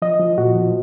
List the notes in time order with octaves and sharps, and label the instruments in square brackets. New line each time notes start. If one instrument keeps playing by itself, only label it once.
[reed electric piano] F3 D#5
F3
A#2 F#4
F3